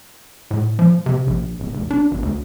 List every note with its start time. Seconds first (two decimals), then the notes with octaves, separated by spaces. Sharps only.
0.51 A2
0.79 F3
1.06 C3
1.27 A#1
1.60 D1
1.73 F1
1.91 D4
2.11 G#1
2.23 D2